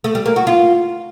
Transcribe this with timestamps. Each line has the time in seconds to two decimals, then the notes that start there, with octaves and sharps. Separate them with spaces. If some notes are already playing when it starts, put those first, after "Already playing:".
0.04 A3
0.15 G3
0.26 A#3
0.36 F#4
0.47 F4